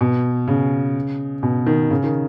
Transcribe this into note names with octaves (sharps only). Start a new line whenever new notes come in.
B2
C#3
B2
D#3
C#3
D#3